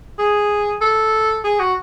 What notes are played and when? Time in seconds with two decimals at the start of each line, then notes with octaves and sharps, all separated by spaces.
0.19 G#4
0.82 A4
1.44 G#4
1.60 F#4